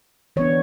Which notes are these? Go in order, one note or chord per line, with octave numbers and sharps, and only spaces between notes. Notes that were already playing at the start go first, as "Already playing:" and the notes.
E3 B3 D4 C#5